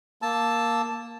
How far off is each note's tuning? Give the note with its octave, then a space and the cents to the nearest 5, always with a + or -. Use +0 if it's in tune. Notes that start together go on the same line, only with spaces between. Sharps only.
A#3 +0 A5 +0 E6 +0